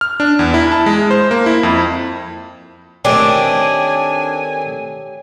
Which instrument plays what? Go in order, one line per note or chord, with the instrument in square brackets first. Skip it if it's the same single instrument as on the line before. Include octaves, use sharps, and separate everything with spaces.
[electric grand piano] F6
D4
E2
E4
A5
G#3
C5
A#3
E4
F2
[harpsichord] D#3 A3 C4 [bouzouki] D4 [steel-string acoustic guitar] G4 C#5 G5 [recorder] G#5